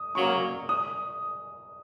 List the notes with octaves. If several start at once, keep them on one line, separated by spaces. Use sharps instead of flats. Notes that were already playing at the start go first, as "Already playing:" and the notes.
Already playing: D#6
C#3 F#3 A#3 C#6
D#6